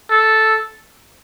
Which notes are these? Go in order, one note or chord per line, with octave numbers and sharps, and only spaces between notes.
A4